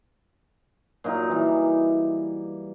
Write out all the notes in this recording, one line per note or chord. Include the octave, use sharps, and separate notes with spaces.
A#2 F#3 D#4
E3 G3